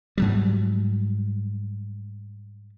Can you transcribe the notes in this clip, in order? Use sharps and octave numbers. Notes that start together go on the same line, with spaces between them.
G#2 F#3 G3